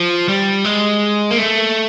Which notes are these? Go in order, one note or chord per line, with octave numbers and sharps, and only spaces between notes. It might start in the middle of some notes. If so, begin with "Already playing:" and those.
Already playing: F3
G3
G#3
A#3
A3